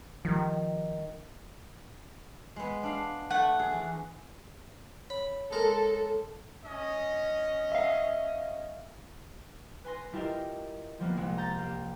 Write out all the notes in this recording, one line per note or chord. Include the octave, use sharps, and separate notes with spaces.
D#3 F3 G3
G#3 B3
D4 F5
A3 F#5
G#4
E2
C#5 B5
G#3 A4 A#4
C#4 D#5
E5 F5
B4 G#5 C6 A#6
G3 E4 F4 G4 A#4 D#5
F3 G3 A#3 B3
C2 G#3
A#5 G6 A6
A#3 G4